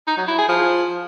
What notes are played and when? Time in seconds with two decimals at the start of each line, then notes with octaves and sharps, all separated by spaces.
0.07 D#4
0.17 F#3
0.28 E4
0.38 G#4
0.49 F3